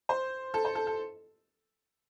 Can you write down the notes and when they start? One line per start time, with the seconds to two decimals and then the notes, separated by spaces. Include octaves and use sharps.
0.09 C5
0.54 A4
0.65 C5
0.75 A4
0.87 A4